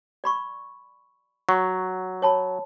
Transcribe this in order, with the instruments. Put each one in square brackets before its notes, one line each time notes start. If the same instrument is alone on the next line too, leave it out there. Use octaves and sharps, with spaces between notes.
[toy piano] D5 B5 C#6
[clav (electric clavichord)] F#3 [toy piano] C#6
[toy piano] C#5 A5 B5